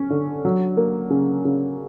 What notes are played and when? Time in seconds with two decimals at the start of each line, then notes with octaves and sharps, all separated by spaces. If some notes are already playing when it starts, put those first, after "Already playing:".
Already playing: C#4
0.10 D3
0.45 F#3
0.77 A#3
1.10 C#3
1.45 C#3